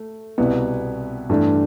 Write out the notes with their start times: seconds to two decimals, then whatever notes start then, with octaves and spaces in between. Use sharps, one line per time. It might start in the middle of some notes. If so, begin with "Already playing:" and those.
Already playing: A3
0.38 C2 B2 B3 E4
1.29 G2 E3 A3 D4